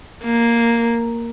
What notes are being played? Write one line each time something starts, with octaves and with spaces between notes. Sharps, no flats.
A#3